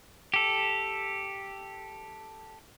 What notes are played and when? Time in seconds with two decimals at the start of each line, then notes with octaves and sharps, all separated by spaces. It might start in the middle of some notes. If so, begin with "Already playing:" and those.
0.34 G4 A4